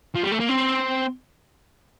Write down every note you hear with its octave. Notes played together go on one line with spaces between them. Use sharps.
F3
G3
A3
A#3
C4